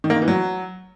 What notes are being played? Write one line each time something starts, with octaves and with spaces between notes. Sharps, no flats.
D#3
A#3
D#3
E3
F#3